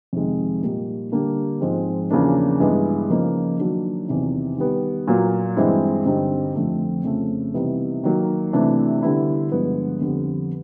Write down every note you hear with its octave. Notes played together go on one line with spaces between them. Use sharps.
F2 C3 D#3 G#3
A#2 G3 A#3 D#4
D3 G3 A#3 D4
G#2 F3 G#3 C4
E2 C#3 F3 A#3 D4
G2 E3 G#3 B3
C#3 F3 A#3 D#4
D#3 F#3 A#3 D4
E2 C3 D#3
D#3 G3 B3
A#2 F#3 A#3
G2 E3 G#3 C4 E4
G2 D3 G3 C4 D#4
F2 D3 F3 A3 C4
F2 C#3 F3 A3
C3 E3 G3 B3 D#4
D#3 F#3 A#3
C3 E3 A3 D4
D3 G3 B3 E4
G2 D3 F3 G#3 B3
F2 D3 G3 B3